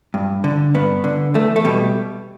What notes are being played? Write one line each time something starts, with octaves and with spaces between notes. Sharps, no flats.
G2
D3
G2 B3
D3
E2 A3
A3
B2 G3